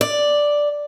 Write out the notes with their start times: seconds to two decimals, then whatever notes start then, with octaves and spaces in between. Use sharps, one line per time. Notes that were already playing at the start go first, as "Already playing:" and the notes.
0.01 D5